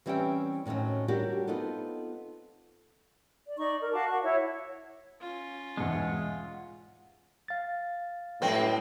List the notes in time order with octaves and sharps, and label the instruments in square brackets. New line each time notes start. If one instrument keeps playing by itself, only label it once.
[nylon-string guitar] E3 G3 C4 C#4 E5 G5
A2 D#3 F#3 C4 C#4
F#3 G3 D4 F#4 G4 A#4
B3 C4 D#4 F4 A4
[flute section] D5
D#4 D5 C#6
A#4
F#4 F5 A5 D6
F#5 C#6
E4 C#5 E5
[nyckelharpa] C#4 F4
[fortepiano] E2 G#2 B2 [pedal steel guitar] G#3 F#5
[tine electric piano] F5 A6
[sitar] F#2 G#3 C4 [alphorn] A2 [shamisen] B4 G5